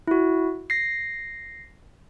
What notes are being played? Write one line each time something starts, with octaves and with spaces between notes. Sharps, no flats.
E4 F#4
A#6 C7